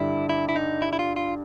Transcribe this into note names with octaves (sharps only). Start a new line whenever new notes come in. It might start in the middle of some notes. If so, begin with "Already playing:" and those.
Already playing: G2 D3 G3 E4
E4
E4
D#4
E4
E4
F4
F4